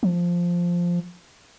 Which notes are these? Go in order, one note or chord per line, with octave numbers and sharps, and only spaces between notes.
F3